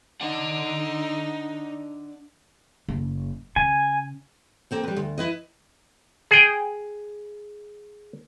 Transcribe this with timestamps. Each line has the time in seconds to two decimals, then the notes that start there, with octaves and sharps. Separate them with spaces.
0.21 D4 D#4 F#5
2.88 F#1
3.56 C#3 G#5
4.71 A#3 C4 A4
4.83 G3 B4
4.96 D2
5.18 E4 B4 D#5
6.31 G#4 G5